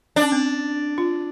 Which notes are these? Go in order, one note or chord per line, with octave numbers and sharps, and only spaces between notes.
D4
C#4
C4
F4